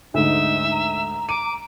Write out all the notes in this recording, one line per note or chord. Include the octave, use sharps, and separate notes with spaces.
D2 G#2 D#4 E5
A#5
D6 D#7